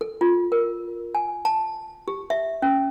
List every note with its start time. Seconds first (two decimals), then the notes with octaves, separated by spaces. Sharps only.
0.01 A4
0.21 F4
0.52 A#4
1.15 G#5
1.45 A5
2.08 G4
2.30 E5
2.62 C#4